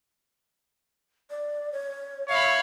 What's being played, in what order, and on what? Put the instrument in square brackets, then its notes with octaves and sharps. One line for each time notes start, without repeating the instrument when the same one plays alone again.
[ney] D5
C#5
[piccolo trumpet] C#5 [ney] E5 [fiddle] F5 B5